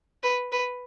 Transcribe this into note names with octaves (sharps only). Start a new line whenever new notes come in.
B4
B4